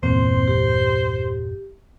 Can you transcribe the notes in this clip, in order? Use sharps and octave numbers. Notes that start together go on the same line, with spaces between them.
G1 E2 A#2 C4 C5
G4